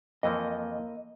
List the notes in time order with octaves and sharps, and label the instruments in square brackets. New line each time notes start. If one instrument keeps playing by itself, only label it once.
[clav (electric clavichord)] F2 E3 F3 [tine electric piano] A#3 [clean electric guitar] D#5